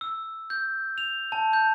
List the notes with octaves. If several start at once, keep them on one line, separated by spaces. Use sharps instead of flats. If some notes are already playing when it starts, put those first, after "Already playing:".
E6
G6
F7
A5
G6